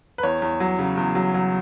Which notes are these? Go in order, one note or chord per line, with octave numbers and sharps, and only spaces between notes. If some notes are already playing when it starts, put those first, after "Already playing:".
B4
E2 C#5
E2
F#3
C#3
E2
F#3
F#3